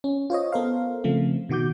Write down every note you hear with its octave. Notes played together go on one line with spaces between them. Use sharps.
C#4
F4 C5 C#5 D#5
B3 A4 A#4 C5 F5
C#3 F3 A3 C4
B2 D#3 F#4 D6 G6